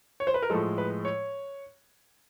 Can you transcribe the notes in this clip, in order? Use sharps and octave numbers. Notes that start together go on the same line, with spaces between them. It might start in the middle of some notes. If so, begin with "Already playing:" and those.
C#5
C5
B4
A#4
A2 F3 G#3 A4
B4
C#5